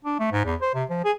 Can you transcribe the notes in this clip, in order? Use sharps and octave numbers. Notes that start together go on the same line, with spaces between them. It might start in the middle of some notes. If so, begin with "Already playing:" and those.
D4
A3
G#2
E2
C5
C3
F3
G#4